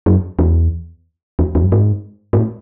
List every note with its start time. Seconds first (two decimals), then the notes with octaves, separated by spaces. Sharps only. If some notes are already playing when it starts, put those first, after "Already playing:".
0.06 F#2
0.39 E2
1.39 E2
1.55 E2
1.63 F#2
1.72 G#2
2.33 G#2
2.38 A2